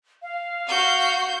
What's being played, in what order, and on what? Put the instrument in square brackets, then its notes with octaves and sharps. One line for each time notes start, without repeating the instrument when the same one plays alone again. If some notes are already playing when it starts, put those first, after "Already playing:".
[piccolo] F5
[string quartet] F#4 G6